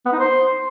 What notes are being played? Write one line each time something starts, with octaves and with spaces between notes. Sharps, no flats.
B3
D#4
C5